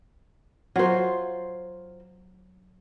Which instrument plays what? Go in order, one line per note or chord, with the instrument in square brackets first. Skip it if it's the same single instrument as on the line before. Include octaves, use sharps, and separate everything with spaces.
[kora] F#3 [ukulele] F4 C5